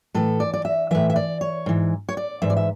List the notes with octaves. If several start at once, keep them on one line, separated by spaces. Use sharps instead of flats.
A2 E3 A4
D5
D5
E5
A2 E3 E5
E5
D5
C#5
G#2 E3
C#5
D5
G#2 E3 E5
D5
E5